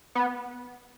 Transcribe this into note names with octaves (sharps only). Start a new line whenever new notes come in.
B3